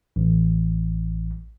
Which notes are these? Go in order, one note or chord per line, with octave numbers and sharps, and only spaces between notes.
A1